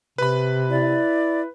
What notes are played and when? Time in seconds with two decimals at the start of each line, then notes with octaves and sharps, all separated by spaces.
0.18 C3 B4 B5
0.70 E4 D5